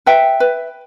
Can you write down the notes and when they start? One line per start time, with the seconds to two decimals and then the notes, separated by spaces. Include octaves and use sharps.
0.06 B4 E5 G5
0.40 B4